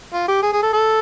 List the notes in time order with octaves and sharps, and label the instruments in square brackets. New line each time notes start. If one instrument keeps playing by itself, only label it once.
[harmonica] F4
G4
G#4
G#4
A4
A4